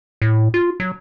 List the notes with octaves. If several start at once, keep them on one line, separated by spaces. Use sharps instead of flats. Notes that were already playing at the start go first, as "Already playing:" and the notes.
A2
F4
F#3